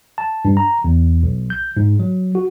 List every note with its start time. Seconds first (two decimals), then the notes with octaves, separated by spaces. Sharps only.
0.18 A5
0.45 G2
0.57 A#5
0.84 E2
1.23 B1
1.50 G6
1.77 G#2
2.00 F#3
2.35 F#4